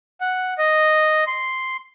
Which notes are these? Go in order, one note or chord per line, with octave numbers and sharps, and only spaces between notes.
F#5
D#5
C6